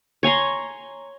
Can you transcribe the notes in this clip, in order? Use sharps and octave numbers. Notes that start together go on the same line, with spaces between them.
C#5 G#5 A#5 C6